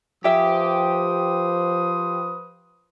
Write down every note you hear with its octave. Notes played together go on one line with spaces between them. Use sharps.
F3 G4 G#4 B4 C5 E5 D#6